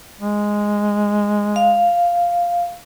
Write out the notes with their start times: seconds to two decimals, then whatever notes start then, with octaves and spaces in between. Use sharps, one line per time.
0.21 G#3
1.56 F5